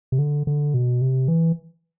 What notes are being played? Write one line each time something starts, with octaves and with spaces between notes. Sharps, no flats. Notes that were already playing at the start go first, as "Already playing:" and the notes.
C3
D3
D3
B2
C3
E3